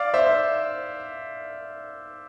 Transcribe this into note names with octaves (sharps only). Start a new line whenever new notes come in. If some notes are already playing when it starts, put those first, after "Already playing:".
Already playing: D5 F5
C5 E5